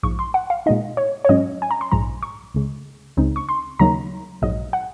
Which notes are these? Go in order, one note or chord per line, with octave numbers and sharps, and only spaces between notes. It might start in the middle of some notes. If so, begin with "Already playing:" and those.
A#1 G#2 F3 C#6
C6
F#5
F5
A#2 G#3 D#4 D#5
C#5
C#5
G#2 F#3 C#4 D#5
G#5
A#5
C6
A#1 G#2 F3 A#5
C#6
C#2 C#3 G#3
C#2 C#3 G#3 C4 D#4
C#6
C6
D#2 C#3 F#3 A#3 D#4 A#5
A#1 G#2 F#3 D#5
F#5